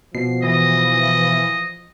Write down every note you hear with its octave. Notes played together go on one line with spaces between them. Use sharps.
B2 F3 C7
E3 D#5